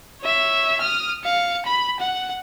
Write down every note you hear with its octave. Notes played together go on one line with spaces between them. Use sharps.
C#5 E5
D#6 F6
F5 C#7
B5
F#5